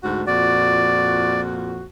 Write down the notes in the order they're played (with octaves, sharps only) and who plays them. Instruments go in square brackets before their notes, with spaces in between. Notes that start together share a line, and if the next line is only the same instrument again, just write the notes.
[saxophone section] D2 G#2 F#4
[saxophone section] F2 A#2 F#4 [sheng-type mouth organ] D5